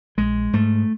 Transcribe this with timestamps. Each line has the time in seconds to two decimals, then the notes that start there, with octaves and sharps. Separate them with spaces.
0.17 A#1 G#3
0.53 G#2 A3